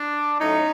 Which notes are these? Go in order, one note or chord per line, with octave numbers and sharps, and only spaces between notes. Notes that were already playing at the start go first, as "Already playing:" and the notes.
Already playing: D4
A2 F#3 A3 C#4 D#4